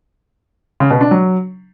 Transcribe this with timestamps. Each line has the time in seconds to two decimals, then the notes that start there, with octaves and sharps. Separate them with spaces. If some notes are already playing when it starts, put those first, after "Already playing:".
0.80 C#3
0.91 B2
1.01 D4
1.11 F#3